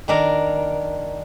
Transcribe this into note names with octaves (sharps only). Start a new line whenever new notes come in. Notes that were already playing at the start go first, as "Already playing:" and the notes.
D#3 D4 A#4